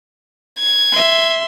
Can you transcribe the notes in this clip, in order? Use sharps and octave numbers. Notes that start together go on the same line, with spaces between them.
G#6
E5 C6